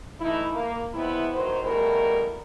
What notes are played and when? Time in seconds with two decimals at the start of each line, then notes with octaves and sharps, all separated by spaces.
0.21 E3 A3 D#4 E4
0.54 A#3
0.93 E2 B2 B3 C4 E4
1.33 D#3 F#3 C5
1.63 B2 G3 A3 E4 G#4 A#4